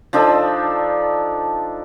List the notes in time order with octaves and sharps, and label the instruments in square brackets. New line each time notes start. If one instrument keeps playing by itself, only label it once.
[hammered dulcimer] F3 D4 D#4 A4